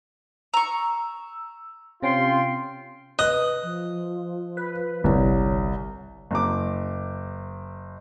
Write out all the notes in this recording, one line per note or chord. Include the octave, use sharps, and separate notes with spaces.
A#5 C#6 E6
C3 C#4 F4 G5 C6
B4 D#5 F#6
F3
B4
G1 C2 C#5
F#1 D6